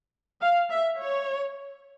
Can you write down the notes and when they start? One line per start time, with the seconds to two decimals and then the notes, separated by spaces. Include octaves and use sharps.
0.41 F5
0.70 E5
1.00 C#5